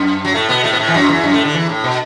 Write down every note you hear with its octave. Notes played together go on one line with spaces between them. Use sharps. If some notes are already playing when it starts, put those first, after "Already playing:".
Already playing: F#2
F#3
A2 A3
B2 B3
A2 A3
B3
A2 A3
E3
F#2 F#3
E2 E3
F#2 F#3
A2 A3
D3
E2 E3
A2
B2